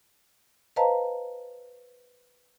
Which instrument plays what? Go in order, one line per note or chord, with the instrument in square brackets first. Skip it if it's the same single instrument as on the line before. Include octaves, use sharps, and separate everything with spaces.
[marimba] B4 C5 D#5 F5 A5 A#5